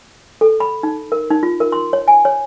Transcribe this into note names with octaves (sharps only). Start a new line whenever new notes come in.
A4
B5
D#4
A#4
D#4
F4
A#4
C6
C#5
G#5
C#5